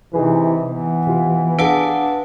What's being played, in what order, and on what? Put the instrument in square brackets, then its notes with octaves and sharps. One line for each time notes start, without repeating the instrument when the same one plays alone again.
[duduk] C3 [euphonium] E3 [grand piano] D#4 G#4 B4
[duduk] E3 [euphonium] B3
[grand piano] C3 F4
[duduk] D4 [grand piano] G#4 D7 [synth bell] B4 F5 F#5